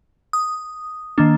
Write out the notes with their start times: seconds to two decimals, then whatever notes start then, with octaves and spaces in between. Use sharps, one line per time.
0.33 D#6
1.18 D#3 A#3 D4